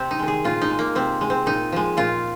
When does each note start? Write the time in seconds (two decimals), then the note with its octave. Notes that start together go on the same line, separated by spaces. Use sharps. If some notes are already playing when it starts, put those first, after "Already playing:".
Already playing: C3 C4
0.11 D#4
0.19 D#3 G#3
0.28 G#4
0.44 A#2 F4
0.62 D#4
0.70 G#3
0.79 A#3
0.95 C3 C4
1.21 G#3
1.30 C4
1.46 A#2 D#4
1.72 F3 G#3
1.97 A#2 F4